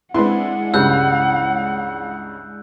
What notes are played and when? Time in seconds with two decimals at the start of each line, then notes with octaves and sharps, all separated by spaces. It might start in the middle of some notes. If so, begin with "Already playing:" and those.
0.14 G#3 C4 D4 E4 B4 F#5 C6
0.74 C#2 G2 C#3 E6 F#6 G6